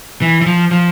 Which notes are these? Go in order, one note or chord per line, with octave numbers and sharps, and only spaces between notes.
E3
E3
F3
F3